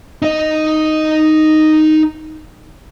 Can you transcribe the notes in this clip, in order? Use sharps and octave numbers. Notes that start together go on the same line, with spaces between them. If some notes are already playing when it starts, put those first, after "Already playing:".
D#4 D#5